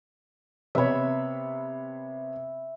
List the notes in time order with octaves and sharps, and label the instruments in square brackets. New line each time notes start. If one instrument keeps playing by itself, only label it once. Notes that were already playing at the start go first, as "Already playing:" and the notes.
[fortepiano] C3 B3 C#5 [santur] E5 B5